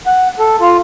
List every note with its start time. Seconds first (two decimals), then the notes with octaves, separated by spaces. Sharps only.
0.07 F#5
0.39 A4
0.61 F4